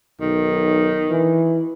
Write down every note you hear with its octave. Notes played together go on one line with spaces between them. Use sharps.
B1 D#3
E3